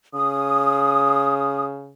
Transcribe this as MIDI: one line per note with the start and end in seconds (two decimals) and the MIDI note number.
0.14 1.94 49
0.14 1.65 87